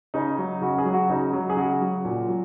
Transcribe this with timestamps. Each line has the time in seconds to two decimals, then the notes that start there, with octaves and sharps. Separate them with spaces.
0.14 C#3 D#4
0.38 F#3
0.62 C#3 F#4
0.78 G#4
0.85 F#3
0.94 F#4
1.09 C#3 D#4
1.33 F#3
1.50 G#4
1.57 C#3 F#4
1.81 F#3
2.05 A#2
2.28 F#3